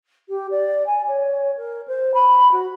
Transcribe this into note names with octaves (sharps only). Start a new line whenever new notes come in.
G4
D5
G#5
C#5
A#4
C5
B5
F#4